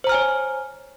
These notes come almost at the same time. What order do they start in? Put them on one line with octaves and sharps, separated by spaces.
C5 A#5 F6 G#5 C#5